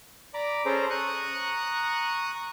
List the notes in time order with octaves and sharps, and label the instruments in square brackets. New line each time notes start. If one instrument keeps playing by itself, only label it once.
[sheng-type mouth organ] D5 A#5 B5 D6
C#4 G#4 A4 C5 A#5
A#5 C#6 D#6 F#6